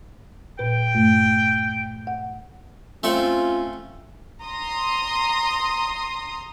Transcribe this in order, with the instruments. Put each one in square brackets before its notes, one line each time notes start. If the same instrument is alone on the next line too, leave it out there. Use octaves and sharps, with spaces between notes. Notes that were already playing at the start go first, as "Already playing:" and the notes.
[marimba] A#2 B4 [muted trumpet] G5
[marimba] G2 A3
F#5
[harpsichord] A3 C4 A4 [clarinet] C#4 [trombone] F4
[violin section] A#5 C6 D#6